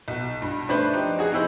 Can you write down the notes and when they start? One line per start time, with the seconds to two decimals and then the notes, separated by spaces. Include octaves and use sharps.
0.08 B1 F#4
0.42 G2
0.69 A3 D4 B4 C5
0.93 F3 D#4 G4
1.19 F#4 G#4
1.32 C3 D#4 E4 C5